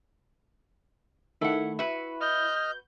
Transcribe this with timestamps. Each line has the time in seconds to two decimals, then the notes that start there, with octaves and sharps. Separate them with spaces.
1.41 D#3 A3 E4 F#5
1.79 E4 F#4 B4
2.21 D#5 F6 G6